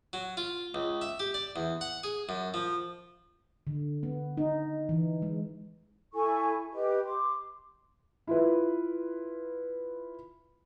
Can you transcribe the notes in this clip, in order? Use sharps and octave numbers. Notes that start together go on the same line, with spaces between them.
F#3
F4
C#2
E5
G4
D5
E2
F#5
G#4
F#2
F3
D3
B3
D#4
E3
G#3
E4 A4 G#5 C#6
G4 B4 D#5
C6 D6
E4 F4 B4